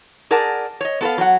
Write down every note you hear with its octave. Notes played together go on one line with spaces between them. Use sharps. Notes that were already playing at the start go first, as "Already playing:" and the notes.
G#4 A#4 D5 F#5 A5
C#5 D#5
B3 A4 B4 F5
F#3 F#5